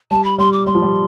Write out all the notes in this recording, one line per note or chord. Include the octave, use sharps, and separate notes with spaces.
G3 A5
B5
G3 C6
D6
G3 C6
F3
G3